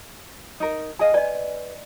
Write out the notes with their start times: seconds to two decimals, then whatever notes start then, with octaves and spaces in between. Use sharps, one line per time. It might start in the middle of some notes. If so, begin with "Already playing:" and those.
0.60 D#4 A#4
0.99 G#4 D#5 F5 G#5
1.14 B4 D5 D#5 G#5